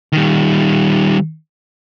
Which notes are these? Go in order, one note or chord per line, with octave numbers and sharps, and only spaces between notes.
D#3 G3